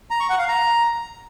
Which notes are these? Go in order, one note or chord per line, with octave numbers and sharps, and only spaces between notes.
A#5
C#6
F#5
F5
A#5